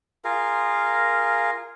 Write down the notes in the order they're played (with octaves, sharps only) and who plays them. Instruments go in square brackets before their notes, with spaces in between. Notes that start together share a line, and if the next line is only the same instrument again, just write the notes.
[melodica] F4 G#4 A#4 F5